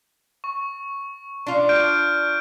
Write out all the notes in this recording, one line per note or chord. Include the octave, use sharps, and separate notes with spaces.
C#6
D4 F4
F6 G6 D7